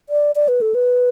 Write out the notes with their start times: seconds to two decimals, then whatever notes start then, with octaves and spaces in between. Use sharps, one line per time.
0.09 D5
0.36 D5
0.48 B4
0.61 A4
0.75 B4